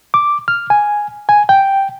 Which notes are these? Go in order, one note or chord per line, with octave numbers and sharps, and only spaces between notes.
D6
F6
G#5
G#5
G5